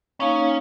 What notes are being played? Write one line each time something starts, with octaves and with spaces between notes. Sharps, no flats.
A#3 C#4 D#4 C#5 F5